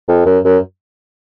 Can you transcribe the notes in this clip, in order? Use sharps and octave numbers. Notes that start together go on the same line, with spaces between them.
F2
F#2
F#2